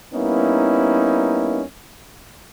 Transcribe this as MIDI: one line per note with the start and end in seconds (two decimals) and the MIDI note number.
0.13 1.62 55
0.13 1.62 58
0.13 1.62 59
0.13 1.62 61
0.13 1.62 63
0.13 1.62 64